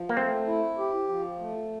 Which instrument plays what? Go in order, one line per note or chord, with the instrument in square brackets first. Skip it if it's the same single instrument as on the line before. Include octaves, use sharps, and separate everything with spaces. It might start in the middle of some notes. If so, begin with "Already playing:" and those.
Already playing: [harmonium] F3
[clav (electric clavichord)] A#3
[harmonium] A3 [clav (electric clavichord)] C4
[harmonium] E4
G4
F3
A3